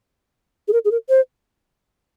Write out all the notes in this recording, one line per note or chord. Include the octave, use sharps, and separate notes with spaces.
G#4
A#4
G#4
A#4
C5